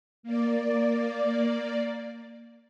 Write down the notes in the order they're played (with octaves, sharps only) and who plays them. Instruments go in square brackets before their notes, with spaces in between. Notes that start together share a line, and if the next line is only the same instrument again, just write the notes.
[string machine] A#3 D5